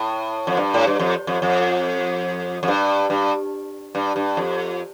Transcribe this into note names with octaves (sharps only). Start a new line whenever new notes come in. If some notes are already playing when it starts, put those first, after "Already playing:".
Already playing: A2
F2
G2
A2
G2
F2
F2
F2
F2
G2
G2
G2
G2
F2